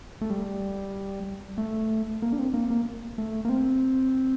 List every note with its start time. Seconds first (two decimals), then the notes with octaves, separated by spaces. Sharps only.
0.21 A3
0.30 G3
1.58 A3
2.22 A#3
2.32 D4
2.39 C4
2.54 A#3
2.70 A#3
3.18 A3
3.45 A#3
3.49 C4